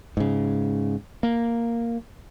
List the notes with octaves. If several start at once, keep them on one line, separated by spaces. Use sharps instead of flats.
G#2 C#3
A#3